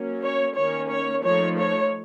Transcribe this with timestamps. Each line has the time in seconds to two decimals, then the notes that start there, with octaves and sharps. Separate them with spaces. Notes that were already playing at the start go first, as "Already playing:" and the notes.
Already playing: F#3 A#3 C#4
0.24 C#5
0.57 D#3 A#3 C#4 C#5
0.91 C#5
1.25 F3 A3 D#4 C#5
1.60 C#5